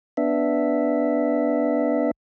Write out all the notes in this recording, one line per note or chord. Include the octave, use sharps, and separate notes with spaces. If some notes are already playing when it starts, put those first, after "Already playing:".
B3 D4 E5